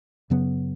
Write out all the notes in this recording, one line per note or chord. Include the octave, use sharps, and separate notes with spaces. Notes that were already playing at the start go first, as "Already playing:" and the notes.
F#2 C#3 F#3 B3